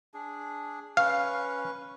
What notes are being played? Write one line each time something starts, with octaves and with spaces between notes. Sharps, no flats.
D4 G#4
C#4 B4 F5 C#6